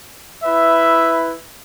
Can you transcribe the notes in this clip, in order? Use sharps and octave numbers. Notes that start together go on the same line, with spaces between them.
E4 B4 E5